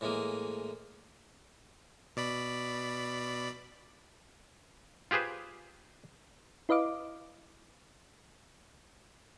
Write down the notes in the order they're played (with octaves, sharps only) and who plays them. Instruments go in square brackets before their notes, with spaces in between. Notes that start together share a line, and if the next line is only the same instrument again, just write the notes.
[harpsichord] A2 E3 G#3 A#3
[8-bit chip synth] B2 D5 B5
[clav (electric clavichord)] F4 G4 G#4 B4 C5
[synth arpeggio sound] E4 B4 D#5 F5 D6